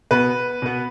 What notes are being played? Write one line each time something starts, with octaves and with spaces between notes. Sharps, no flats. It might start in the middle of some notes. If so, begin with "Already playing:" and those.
B2 B3 B4
B2 B3